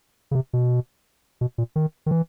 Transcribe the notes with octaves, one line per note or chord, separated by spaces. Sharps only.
C#3
C3
B2
B2
A#2
D#3
D#3
E3